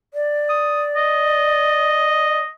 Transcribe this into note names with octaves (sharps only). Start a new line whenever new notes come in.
D5
D#6
D#5